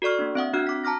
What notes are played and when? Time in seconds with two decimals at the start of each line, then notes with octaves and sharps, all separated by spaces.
0.02 F#4 A4 D5 C#6 F6
0.19 A#3 D4
0.35 C4 E5 F#5 D#6
0.53 C4 D4 F#4 F6 F#6
0.67 D6 B6
0.84 A5 A#5 D6 F6 A#6